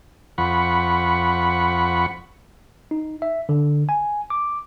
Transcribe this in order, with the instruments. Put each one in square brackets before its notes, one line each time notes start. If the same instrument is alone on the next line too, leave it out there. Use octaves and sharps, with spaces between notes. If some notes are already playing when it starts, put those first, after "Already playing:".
[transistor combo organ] F2 F#5 B5 C#6
[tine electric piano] D#4
E5
D3
G#5
D6